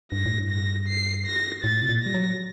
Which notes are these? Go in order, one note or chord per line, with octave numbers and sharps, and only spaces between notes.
G2 A#6
A2
G2
A#6
C7
A#6
A2 A6
C3
A#2
G3 A#6
F#3